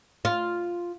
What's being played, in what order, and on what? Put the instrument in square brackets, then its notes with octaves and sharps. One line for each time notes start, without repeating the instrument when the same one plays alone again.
[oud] F4